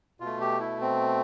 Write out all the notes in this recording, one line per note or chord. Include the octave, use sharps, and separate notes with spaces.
B2 F4
A3
G4
E4
C4